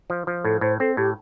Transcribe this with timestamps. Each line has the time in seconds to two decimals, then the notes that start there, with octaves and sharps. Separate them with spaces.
0.10 F3
0.27 F3
0.44 A2 A4
0.61 A2 C5
0.80 C4 A4
0.97 A2 G4